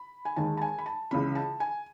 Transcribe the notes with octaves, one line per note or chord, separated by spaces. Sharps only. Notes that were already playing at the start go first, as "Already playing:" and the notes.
Already playing: B5
G#5
D#2 D#3 G#3 A5
A5
G#5
B5
A5
C#2 C#3 E3 B5
A5
G#5